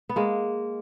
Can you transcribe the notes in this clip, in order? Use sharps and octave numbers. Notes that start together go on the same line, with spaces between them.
B3
G#3 A#3